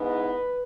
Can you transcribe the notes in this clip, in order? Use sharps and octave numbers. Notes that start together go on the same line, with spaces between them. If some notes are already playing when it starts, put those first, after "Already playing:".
Already playing: G#2 E3 B3 D#4 B4